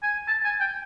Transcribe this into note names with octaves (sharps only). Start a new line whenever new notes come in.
G#5
A5
G#5
G5